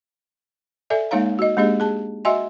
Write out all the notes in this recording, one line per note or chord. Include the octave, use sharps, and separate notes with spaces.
A4 D5 E5 G#5
G#3 A#3 D#4 C#5 F5 A#5
F#4 D#5
G#3 A#3 D4 G4 G#4 D#5
G#4 A5
F#4 D#5 E5 F#5 G#5 C6